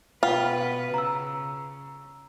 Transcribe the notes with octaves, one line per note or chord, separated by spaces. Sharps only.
B2 F4 B4 F#5 G5
C#3 A#5 E6